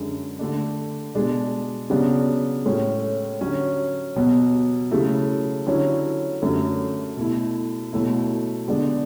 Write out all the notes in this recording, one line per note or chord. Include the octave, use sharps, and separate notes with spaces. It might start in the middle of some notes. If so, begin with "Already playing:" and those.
Already playing: F#2 D3 G#3
D3 A3 D4
B2 G#3 D4
C#3 F#3 B3 D4
A2 G#3 C#4
D3 F#3 C#4
B2 F#3 B3
C#3 F#3 A3 E4
D3 F#3 C#4 E4
F#2 D3 F#3 A3
B2 A3 E4
B2 F#3 A3 E4
D3 G#3 B3 D4